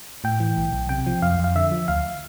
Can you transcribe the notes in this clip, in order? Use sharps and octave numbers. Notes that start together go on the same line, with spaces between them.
A2 G5
E3
B1
B1
C3 G5
F3
F2 F5
F2 F5
D3 E5
F3
D2 F5